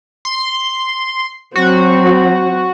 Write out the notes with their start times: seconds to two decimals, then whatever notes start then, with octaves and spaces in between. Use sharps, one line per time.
0.25 C6
1.56 F#3 C4 F#4